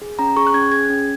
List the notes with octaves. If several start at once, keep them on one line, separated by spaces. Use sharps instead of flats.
G#4
C#4 A#5
G#4 C#6
F#6
C#4 G#6
G#4 G#6
C#4